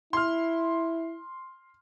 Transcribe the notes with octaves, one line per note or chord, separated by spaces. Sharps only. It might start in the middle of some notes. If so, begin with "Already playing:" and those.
E4 C6 F6